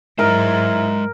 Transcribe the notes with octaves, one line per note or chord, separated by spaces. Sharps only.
G#2 F#3 G#3 E4 A#4 C5 D#5